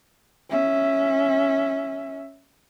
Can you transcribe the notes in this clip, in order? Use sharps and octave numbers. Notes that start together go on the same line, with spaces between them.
C#4 E5